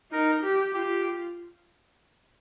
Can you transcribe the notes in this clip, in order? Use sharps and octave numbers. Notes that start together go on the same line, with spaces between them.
D#4 A#4
G4
F4 G4